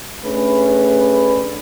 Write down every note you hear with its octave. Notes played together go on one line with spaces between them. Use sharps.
A3 C#4 D4 G#4 B4